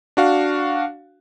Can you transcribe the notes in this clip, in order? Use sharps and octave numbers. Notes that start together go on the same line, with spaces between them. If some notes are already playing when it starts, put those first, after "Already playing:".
D4 F#4 F5